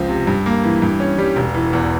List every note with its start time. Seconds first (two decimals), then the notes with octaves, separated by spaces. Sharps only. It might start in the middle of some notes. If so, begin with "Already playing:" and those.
Already playing: C#2 F3
0.09 C3
0.27 G2
0.46 A#3
0.64 E3
0.82 G2
1.00 C#4
1.18 G3
1.36 E1
1.54 E3
1.73 E2